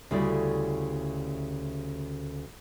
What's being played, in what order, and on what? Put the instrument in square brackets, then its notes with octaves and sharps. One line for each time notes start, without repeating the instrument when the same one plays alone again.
[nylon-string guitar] D2 C#3 G3 E4 D5